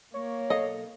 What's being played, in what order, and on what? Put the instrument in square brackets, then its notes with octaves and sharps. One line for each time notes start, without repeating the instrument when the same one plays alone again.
[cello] A#3 [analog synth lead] C#5
[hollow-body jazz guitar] B1 A4 F5 [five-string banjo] D#5